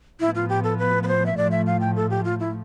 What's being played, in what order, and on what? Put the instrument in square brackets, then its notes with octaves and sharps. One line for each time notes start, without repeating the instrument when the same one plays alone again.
[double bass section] A2 F3 B3 [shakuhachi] E4
[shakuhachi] F4
G4
A4
B4
B4
C5
E5
[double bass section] A2 F3 A3 [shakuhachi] D5
[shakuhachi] E5
F5
G5
A4
G4
F4
E4